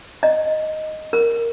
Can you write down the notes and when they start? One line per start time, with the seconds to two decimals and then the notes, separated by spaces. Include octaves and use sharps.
0.23 D#5
1.13 A#4